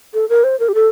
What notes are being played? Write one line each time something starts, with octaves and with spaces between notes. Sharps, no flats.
A4
A#4
C5
A#4
G4
A4